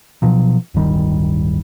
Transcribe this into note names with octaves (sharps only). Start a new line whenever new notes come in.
B2 F3 F#3
D1 G1 D#3 G3